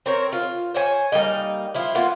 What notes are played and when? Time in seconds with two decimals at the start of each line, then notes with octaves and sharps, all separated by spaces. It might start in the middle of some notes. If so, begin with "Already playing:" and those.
0.06 C4 A#4 C#5
0.32 F4
0.74 C5 C#5 G#5
1.12 G3 A#3 D#4 D#5
1.74 F3 E4 F4
1.95 A#3 B3 F4